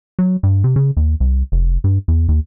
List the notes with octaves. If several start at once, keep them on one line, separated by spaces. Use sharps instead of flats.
F#3
G2
C3
C#3
D#2
C2
F1
G2
E2
D#2